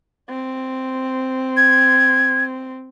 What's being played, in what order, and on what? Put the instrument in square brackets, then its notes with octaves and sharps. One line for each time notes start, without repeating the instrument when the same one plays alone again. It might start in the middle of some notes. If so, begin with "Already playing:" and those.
[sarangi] C4
[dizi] G#6